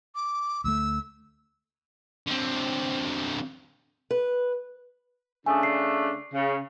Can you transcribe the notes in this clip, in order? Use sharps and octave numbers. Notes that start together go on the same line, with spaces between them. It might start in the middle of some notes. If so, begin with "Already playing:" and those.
D6
D2 F#3 A3 E6
D3 C4
B4
C#3 A3 D4 G#5 D#6
C7
C#3